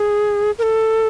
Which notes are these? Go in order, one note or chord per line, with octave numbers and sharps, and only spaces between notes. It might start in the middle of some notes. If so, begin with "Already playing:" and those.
Already playing: G#4
A#4
A4